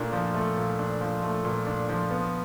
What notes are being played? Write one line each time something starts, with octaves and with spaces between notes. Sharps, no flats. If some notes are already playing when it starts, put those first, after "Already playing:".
Already playing: A#2 A3 D4
F3
A3
A#2
D4
F3
A3
A#2
D4
F3
B3